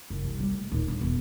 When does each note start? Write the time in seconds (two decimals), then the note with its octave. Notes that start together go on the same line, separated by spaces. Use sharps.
0.10 F#1
0.24 C2
0.40 G3
0.52 A3
0.72 D#1
0.88 D4
1.01 E1